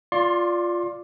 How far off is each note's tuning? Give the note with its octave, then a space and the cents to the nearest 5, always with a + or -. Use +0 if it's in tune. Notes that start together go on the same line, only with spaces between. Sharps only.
F4 +0 D5 +0 C6 +30